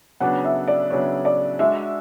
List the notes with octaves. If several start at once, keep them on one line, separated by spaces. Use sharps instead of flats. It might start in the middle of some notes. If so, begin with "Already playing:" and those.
C#3 F#3 B3 D4 F#5
E5
D5
C#3 F#3 B3 D4 C#5
D5
G#3 D4 F#4 E5